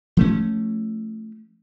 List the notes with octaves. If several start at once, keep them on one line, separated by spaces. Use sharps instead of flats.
F3 A3 C#4